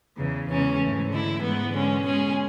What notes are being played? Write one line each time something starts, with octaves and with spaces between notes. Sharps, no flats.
E2 C#3 E3
E2 C#3 E3 G#3 C#4
G#2 E3 A3
D3 A3 E4
G#2 E3 G#3 B3
D3 G#3 C#4
B2 G#3 C#4 G#4